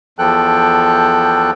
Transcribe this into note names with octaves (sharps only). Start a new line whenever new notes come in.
E2 F3 A4 G5 F#6